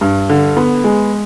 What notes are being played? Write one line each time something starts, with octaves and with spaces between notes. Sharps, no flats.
G2
D3
B3
G#3